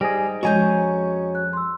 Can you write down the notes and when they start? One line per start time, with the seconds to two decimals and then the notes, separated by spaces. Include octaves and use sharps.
0.01 G#2 G3 G#4 G#5 A#6 D7
0.43 F2 G#3 C#4 F#4 D#5 G#5 A#5 G6
1.35 F#6
1.53 C6 E6